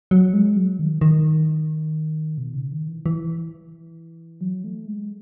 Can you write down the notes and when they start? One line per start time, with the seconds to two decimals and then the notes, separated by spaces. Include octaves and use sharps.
0.11 F#3
0.34 G#3
0.57 F#3
0.79 D#3
1.01 D#3
2.38 B2
2.54 C#3
2.72 D#3
2.88 E3
3.06 E3
4.41 F#3
4.64 A3
4.86 G#3